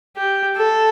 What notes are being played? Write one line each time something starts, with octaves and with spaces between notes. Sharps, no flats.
G4
A4